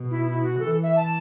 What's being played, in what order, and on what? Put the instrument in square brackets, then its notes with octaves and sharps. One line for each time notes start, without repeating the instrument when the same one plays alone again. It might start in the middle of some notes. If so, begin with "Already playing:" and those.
Already playing: [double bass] B2
[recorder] E4
E4
F#4
[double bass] E3 [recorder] A4
[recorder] E5
A5